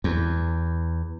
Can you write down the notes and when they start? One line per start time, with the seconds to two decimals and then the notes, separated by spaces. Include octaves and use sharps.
0.04 E2